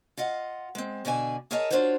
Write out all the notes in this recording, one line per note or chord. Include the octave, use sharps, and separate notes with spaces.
F4 D#5 F5 F#5
G#3 C4
B2 D3 D5 E5 G#5
G#4 A#4 C#5 D#5 E5 A5
D4 D#4 F4 F#4 C5 C#5